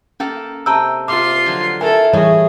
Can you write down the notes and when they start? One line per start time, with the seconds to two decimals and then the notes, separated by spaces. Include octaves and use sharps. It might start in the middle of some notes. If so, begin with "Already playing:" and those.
0.20 A#3 C#4 A4 A5
0.66 C3 D#5 G5 A5 A#5 E6
1.08 C3 G3 F4 C6 D6
1.46 D3 F3 F#3
1.81 A3 E4 A4 A#4 G#5 A#5
2.13 A2 E3 G3 A3 G#4 C#5 D#5 E5